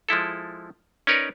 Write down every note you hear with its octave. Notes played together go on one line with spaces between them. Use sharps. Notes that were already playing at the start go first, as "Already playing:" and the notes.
F3 G#3 E4 A4
C#4 D#4 A#4 B4 C#5 D5